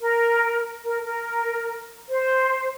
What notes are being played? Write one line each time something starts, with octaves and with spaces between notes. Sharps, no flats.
A#4
A#4
A#4
C5